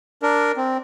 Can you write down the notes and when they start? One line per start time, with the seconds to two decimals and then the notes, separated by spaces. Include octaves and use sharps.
0.23 D4 A#4
0.57 C4